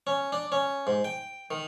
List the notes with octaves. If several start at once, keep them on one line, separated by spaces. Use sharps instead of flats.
C#4
D4
C#4
G#2
G5
D#3